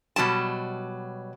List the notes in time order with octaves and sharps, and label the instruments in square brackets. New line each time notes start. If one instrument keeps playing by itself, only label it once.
[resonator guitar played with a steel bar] B2 F#3 G3 A5